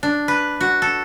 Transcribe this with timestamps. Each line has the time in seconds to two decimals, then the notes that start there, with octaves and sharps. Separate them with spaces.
0.03 D4
0.28 B4
0.61 F#4
0.82 A4